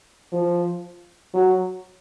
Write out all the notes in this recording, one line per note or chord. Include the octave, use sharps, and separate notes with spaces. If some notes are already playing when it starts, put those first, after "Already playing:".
F3
F#3